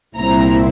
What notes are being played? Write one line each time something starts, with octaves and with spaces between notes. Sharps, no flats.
C2 A#2 G3 C4 E4 A#5